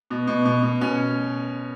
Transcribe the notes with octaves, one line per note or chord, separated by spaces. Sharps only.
B2
B2
B2
B2
B2 C#4